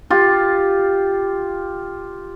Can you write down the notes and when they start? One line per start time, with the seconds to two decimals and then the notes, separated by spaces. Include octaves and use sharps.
0.10 F4 G4